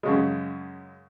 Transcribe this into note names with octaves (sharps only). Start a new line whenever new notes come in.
F#2 C#3 G#3